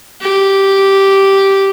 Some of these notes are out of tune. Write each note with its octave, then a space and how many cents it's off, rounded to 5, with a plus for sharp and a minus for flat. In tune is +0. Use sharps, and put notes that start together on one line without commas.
G4 -5